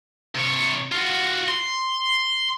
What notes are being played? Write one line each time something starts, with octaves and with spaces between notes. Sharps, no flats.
C3 C#5
F4 F#4
C6